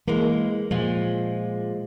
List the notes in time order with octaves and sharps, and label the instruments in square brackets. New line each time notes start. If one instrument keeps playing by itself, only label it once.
[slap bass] E3 [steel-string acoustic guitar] G#3 A#3
[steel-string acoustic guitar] A#2 G#3 [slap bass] F3